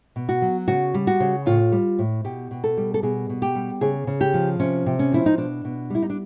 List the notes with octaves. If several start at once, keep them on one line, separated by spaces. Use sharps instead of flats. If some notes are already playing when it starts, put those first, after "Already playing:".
B2
F#4
F#3
C#3 F#4
G3
F#4
C#3
A2 F4
G3
A2
B2 G4
B2
A4
G3
A4
B2 G#4
B2
G4
G3
C#3 G#4
C#3
G4
F3
C3 C#4
C3
C#4
F3 E4
D#4
B2 D4
B2
G3 E4
D#4
D4